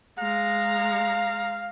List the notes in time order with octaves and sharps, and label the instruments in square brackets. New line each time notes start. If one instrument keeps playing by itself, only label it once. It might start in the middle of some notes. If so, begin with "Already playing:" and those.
[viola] G#3 A#5 [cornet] F5